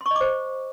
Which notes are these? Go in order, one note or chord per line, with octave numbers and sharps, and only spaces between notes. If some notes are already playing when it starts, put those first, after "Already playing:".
C6
C#6
D#5
D6
C5